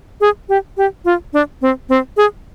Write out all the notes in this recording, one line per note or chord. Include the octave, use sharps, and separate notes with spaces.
G#4
G4
G4
F4
D4
C4
C4
G#4